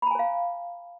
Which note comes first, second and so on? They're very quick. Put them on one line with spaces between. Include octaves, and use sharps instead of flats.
B5 A#5 G#5 C5 F5